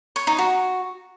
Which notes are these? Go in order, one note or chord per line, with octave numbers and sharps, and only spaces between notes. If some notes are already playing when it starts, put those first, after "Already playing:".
C#5
D#4
F#4